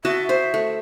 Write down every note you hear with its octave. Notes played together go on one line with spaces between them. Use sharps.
F#4 D#5 E5 A5
C5
A3